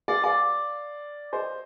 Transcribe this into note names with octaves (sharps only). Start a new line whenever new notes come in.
D5 F5
D5 F5
C5 D#5